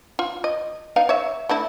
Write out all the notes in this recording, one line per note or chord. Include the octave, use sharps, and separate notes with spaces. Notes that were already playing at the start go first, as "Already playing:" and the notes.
F4
D#5
B3 D#4 F5
C#5 E5
A3 D4 E4